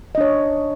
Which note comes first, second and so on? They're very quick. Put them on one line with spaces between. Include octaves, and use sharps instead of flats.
D#5 D4 C#5